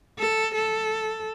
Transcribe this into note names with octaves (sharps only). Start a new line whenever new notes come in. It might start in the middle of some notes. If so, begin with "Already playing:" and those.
A4
A4